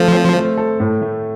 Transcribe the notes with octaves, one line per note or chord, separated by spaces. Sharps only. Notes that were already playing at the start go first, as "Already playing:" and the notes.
Already playing: F3 A3 C4 A4
C4
A3
A4
A2
A3